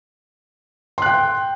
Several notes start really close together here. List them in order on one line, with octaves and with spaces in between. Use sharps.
C6 F#6 G5